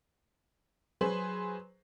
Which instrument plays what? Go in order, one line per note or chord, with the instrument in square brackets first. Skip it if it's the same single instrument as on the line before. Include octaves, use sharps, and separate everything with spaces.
[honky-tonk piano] F#3 G#4 B4 C5 C6 F#7